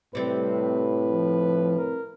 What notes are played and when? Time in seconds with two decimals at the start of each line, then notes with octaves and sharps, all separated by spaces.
0.15 A2 C3 G3 C4 B4
1.06 F3
1.78 A#4